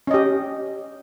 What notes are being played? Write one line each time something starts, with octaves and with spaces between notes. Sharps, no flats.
C#4 G4 D#5